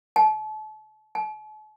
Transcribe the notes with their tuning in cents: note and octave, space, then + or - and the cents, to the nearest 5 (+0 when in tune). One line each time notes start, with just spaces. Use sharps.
A5 -35
A5 -45